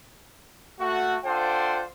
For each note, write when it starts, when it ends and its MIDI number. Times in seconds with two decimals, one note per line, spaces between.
0.80 1.17 57
0.80 1.17 66
1.25 1.84 62
1.25 1.84 65
1.25 1.84 69
1.25 1.84 72
1.25 1.84 78
1.25 1.84 79